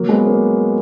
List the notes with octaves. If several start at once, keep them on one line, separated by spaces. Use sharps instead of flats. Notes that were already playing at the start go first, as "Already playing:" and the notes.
Already playing: F#3 A#3
G#3 B3
A#3 C#4